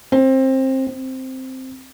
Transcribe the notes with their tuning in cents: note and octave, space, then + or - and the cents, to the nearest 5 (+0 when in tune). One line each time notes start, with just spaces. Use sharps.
C4 +20
C4 +0